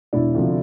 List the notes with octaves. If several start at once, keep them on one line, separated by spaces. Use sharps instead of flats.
E1 D4 E4
D2 C3 F3